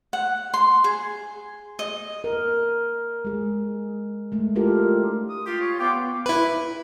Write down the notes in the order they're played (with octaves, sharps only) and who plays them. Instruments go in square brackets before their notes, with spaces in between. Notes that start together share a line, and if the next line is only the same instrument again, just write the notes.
[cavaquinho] F#5
C6
G#4
D#5
[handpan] A#4
G#3 G#4
G#3 A3
D4 E4 F4 G4 A4 A#4
[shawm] D#6
[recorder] F4 [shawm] G4
[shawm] C#5
[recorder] B3 [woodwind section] F5 C6 D6 [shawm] G5
[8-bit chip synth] E4 B4